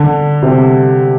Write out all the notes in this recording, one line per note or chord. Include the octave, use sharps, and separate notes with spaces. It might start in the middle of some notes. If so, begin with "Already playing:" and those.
Already playing: D3
C3